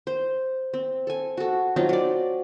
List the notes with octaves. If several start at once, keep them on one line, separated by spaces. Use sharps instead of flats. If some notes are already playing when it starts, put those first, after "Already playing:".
C5
C4
A4 G#5
F#4 A4
F#3 C4 D#4 F4
F#3 D5